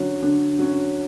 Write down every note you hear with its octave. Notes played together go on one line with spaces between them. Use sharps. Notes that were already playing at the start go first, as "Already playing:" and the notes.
Already playing: D3 F#3 C#4
D3
F#3 C#4